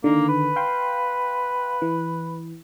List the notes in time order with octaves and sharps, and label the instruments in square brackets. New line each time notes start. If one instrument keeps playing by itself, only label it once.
[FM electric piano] D3 D#3 [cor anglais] A#3
[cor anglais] B4
[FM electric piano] F5 G5 C6
E3